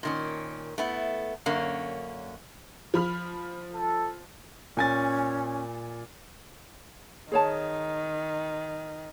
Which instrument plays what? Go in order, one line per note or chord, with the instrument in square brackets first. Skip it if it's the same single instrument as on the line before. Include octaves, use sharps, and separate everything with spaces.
[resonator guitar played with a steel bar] A#2 D#3 C#4
A3 B3 E4
F#2 D3 A#3 C#4
[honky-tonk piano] F3 B5 F6
[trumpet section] A4
[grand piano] A#2 G#5 A6 [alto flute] C#4
[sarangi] D#3 [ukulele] G#4 C#5 A5